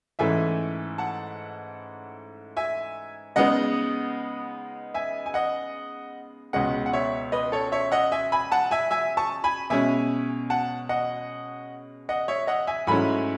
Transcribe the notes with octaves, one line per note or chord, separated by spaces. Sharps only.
G#2 E3 A3 C#4 E4 E5 G#5
F#5 A5
E5 G#5
C#3 G#3 B3 D#4 D#5 F#5
E5 G#5
G#5
D#5 F#5
C#2 B2 G#3 C#4 D#5 F#5
F#5
C#5 E5
B4 D#5
A4 C#5
C#5 E5
D#5 F#5
E5 G#5
G#5 B5
F#5 A5
E5 G#5
E5 G#5
A5 C#6
G#5 B5
B2 G#3 C#4 E5 G#5
F#5 A5
D#5 F#5
D#5 F#5
C#5 E5
D#5 F#5
E5 G#5
G#2 F#3 A3 C#4 E4 G#5 B5